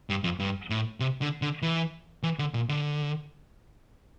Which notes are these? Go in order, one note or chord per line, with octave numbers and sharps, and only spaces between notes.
G2
F2
G2
A2
C3
D3
D3
E3
E3
D3
A#2
D3